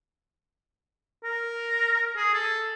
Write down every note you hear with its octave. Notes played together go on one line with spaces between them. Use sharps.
A#4
G#4
A4